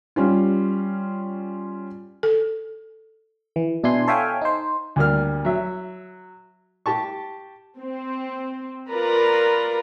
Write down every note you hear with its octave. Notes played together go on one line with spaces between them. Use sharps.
G3 C#4 F4
A4
E3
B2 D4 E4 G#5 C6
A4 C#5 E5 F5 G5 G#5
D#4 C5
D2 G3 A#3 F6
F#3 E5
G4 A5 C#6
C4
F4 A#4 B4 D5 A#5